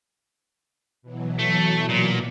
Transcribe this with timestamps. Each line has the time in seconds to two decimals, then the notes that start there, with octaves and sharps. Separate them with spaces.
1.02 B2 E3 F#3
1.39 A3
1.89 A#2